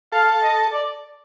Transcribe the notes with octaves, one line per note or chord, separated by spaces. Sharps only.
A4 F5
D#5
D5